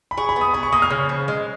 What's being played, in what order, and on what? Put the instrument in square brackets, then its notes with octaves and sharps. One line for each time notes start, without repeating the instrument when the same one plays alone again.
[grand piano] B5
[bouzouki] G#4 [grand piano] C#6
[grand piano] B5
[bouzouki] B3
[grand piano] D#6
[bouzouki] G#4 [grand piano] B5
[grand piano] C#6
[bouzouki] A#3 [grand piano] D#6
[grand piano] F6
[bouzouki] C#3
F3
G#3